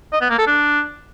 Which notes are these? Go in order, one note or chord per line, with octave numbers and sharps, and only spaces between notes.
D#5
B3
A#3
A4
D4